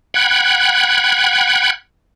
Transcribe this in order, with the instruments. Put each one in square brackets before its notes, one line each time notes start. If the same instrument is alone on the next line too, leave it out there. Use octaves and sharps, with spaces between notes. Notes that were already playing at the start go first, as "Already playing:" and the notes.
[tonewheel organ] F#5 G5 B5 F#6 G#6